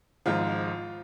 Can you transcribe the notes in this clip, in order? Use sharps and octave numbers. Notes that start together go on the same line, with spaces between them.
G#1 G#2 F3 F4